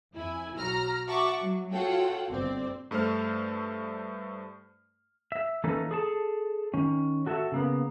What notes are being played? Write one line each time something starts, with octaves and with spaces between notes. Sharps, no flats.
F2 E4 G#5
B1 F#3 A#5 F6
F#4 E5 F#5 A5 C#6 D6
F#3
F4 F#4 A4 C#5 F#5 G5
G1 C4 D5
G2 A3 A4 C5 F6
E5
E3 A#3 C#4 D#4 A4 B4
G#4 A4 A5
D#3 C#4
F#4 A4 C#5 E5
C#3 A#3 B3